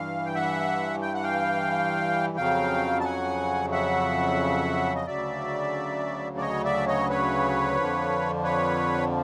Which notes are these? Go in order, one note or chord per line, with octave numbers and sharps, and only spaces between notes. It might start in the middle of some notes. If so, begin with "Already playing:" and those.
Already playing: G2 E3 F5
G5
E5 F#5
G5
F#5
F5 G5
F2 C#3 F#3 F5 G5
A5
F#5 G#5
E5 F#5
D#5
D2 C#3 F#3 D5 E5
D5
C#5 D#5
D5 E5
C#5 D#5
B4 C#5
F2 D3 F3
B4 C#5